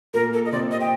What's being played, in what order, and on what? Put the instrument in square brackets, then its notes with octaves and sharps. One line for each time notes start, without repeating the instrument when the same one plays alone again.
[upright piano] A#2 A#3 [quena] A#4
[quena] A4
D#5
[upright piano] C3 C4 [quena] D5
[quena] D#5
G5